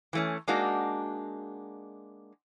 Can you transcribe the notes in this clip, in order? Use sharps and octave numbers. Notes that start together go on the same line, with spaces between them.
E3 A3 C#4
G#3 A#3 D4 D#4 F#4